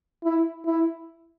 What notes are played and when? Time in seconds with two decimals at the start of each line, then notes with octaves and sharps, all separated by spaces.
0.24 E4
0.66 E4